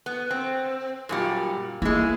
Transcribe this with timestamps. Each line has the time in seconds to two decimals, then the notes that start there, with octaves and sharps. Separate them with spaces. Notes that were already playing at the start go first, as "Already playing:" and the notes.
0.06 B3
0.31 C4
1.09 F#2 A#2 G3
1.82 E3 G#3 A#3